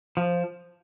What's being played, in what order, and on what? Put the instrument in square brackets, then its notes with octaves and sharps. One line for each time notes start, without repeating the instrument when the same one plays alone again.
[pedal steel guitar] F3